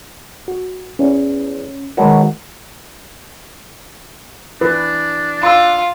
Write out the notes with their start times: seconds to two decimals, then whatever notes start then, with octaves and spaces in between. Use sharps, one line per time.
0.48 F#4
0.99 E2 C#4
1.97 B2 D#3 F#3 G#3 F#4 A#4
4.61 E3 D4 B4
5.43 F4 C6 E6